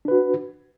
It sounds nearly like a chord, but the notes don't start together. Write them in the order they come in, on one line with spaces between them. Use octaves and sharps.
D4 B4 F#4